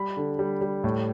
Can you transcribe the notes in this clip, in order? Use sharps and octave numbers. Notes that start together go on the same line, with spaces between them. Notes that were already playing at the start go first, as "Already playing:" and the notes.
Already playing: G3 B5
D3
G3
G3
A2